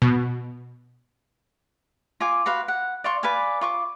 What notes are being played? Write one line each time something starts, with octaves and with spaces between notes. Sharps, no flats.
B2
F4 G#5 D6
F#4 B4 F5 C6
F#5
D5 F5 C6 C#6
B4 D5 F5 G#5
F4 C#6 D6